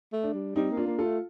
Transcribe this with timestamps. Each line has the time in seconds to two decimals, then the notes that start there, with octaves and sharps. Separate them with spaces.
0.13 A3
0.23 D4
0.34 G3
0.56 G3 C4 D#4
0.71 A#3
0.77 D4 F4
0.87 A#3
0.99 F4 A4
1.04 A3